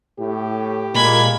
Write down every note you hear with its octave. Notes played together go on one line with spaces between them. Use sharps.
A2 G4
A#2 G#3 A#3 B5 G#6